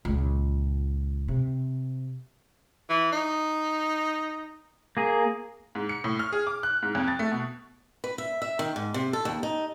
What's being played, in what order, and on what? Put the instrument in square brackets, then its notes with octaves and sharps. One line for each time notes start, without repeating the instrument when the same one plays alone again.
[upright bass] C#2 A#2
C3
[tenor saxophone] E3
D#4
[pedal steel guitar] A#3 G#4
[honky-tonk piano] G#2
C#7
A2
F6
G#4
D6
F#6
G#2
F2
A6
A3
B2
[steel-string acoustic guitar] B4
E5
E5
D#3
G#2
C3
A4
D#2
D#4